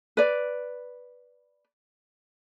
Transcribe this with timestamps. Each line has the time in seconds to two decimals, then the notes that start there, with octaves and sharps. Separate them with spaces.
0.17 B4 D5